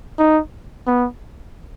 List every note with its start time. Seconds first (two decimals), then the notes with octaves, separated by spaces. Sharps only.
0.19 D#4
0.87 B3